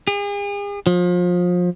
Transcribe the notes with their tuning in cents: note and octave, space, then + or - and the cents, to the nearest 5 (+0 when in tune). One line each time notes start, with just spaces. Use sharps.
G#4 -40
F3 +30